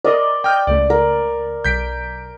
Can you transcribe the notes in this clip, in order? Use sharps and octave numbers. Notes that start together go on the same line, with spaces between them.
A#4 D5 D#5 C6
D#5 G5 F6 G6
C#2 A3 D5
A#4
B1 G6 B6 D7